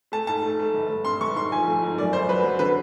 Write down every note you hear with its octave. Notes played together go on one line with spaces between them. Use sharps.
A3 A5
G#2 A5
A3
A3
G1
G1
G2 C6
G1 C#6
G#2 C6
F3 G#5
A3
G#2
F#2 D5
G1 C5
F#3 B4
F#3
D3 B4